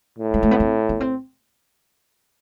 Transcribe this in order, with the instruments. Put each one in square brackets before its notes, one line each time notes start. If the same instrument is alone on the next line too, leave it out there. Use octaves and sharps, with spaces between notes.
[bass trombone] A2
[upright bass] G#3
A3
B3
C4
B3
C4